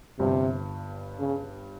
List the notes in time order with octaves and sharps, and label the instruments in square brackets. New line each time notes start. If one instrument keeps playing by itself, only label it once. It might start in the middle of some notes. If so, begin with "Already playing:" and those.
[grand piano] G1 G2 G3 [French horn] C3
[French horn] C#3